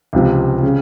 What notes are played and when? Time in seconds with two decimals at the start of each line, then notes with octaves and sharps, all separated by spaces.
0.13 C#2 C3 F3
0.63 C#3